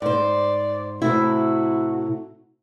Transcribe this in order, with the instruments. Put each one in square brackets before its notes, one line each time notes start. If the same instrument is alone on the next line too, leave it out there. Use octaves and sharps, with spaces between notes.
[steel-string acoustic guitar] G#2 C5 [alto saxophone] D5
[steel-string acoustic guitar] A2 C3 E4 [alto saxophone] F#4